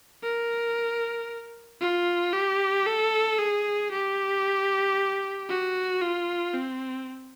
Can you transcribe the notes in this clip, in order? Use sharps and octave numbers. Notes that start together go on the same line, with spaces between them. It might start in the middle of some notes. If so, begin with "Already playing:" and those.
A#4
F4
G4
A4
G#4
G4
F#4
F4
C4